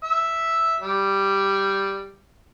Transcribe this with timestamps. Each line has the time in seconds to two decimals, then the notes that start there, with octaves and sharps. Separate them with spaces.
0.04 E5
0.80 G3